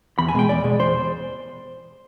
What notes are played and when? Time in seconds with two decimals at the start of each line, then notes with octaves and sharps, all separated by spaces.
0.19 E2 B5
0.29 G#5
0.34 B2 G#3 G5
0.49 E2 D5
0.64 B2 G#3
0.80 E2 C5